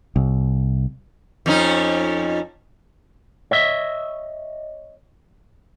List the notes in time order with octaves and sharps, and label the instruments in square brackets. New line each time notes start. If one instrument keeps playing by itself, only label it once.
[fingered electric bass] C2
[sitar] F2 C#4 D#4
[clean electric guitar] C#5 D#5 E5